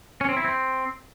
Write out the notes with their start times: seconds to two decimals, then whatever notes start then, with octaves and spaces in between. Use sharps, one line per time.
0.21 C#4
0.29 C4
0.37 E4
0.44 C4